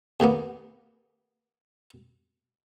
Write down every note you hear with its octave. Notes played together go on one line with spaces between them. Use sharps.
D#2 A2 A#3 B3